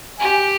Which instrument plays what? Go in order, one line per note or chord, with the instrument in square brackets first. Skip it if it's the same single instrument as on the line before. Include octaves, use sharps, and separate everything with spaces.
[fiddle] G4 [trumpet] G#5